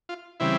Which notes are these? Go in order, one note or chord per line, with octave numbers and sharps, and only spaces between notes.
F4
C#3 E3 G3 C4 E4